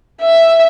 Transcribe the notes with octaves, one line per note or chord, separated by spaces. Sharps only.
E5